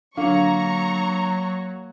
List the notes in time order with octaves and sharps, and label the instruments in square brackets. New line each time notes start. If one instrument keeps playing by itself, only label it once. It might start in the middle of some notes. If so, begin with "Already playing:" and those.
[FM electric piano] D3 [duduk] F#3 [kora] A#3 [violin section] A#5 C#6